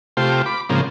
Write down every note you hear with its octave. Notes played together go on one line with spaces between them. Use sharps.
C3 A3 F4 G4 C5
B5 D6
G#2 C#3 F3 A#3 C4